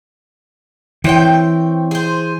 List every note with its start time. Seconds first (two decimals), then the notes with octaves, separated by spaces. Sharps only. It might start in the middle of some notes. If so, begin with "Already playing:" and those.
1.04 E3 C4 C#5 G5
1.91 G#4 C5